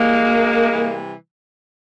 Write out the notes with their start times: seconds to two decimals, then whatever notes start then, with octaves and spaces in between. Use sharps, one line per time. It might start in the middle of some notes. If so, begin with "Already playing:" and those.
Already playing: E3 G3 G#3 A#3
0.25 D2
0.70 C3 E3 G3